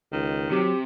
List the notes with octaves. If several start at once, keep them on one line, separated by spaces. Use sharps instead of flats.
C#2 D#3
C3 F#3 G4